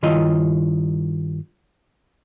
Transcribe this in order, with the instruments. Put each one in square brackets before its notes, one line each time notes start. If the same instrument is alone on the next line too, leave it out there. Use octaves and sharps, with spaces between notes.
[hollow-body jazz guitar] G2 D#3 E4 F4 C#5 D#5